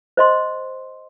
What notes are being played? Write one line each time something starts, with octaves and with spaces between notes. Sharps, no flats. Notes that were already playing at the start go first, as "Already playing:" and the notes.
C5 D#5 C6